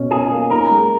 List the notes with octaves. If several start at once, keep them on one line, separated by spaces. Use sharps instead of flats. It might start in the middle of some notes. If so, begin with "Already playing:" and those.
Already playing: B2 C#4
F4 G#4
A#3
D#4 A#4
G#3